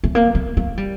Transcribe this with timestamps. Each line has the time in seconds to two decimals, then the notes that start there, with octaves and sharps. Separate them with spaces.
0.04 A3
0.15 A#3
0.35 A3
0.57 A3
0.77 G3